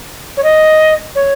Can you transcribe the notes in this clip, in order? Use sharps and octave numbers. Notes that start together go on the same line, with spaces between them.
C#5
D#5
C#5